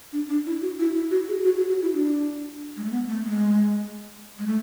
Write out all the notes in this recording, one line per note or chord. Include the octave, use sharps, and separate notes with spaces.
D4
D4
E4
F#4
E4
E4
F#4
G#4
F#4
F#4
F#4
E4
D4
G#3
A3
B3
A3
G#3
G#3
A3